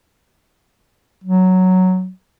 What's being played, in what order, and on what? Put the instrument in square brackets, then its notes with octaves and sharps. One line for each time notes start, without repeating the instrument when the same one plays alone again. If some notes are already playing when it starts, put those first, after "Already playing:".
[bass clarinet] F#3